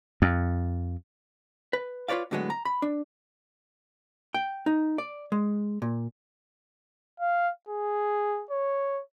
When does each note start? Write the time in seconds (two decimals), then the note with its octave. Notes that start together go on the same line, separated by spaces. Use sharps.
0.22 F2
1.73 B4
2.08 F4 B4 C#5 D5 F5
2.31 A2 D3 F#3 G#3 B3
2.50 A#5
2.65 B5
2.82 D4
4.34 G5
4.66 D#4
4.98 D5
5.32 G#3
5.82 A#2
7.20 F5
7.69 G#4
8.51 C#5